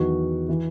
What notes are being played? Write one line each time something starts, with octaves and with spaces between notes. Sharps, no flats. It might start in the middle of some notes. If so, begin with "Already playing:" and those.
Already playing: E2 D#3 F#3 F#4
E3